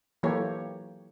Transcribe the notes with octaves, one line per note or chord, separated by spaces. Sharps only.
E3 F#3 A#3 G4 A4 C#5